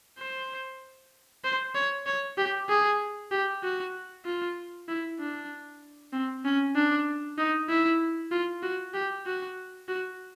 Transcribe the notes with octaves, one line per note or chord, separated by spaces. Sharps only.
C5
C5
C#5
C#5
G4
G#4
G4
F#4
F4
E4
D4
C4
C#4
D4
D#4
E4
F4
F#4
G4
F#4
F#4